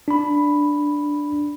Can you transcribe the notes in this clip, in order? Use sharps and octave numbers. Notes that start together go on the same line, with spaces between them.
D4 B5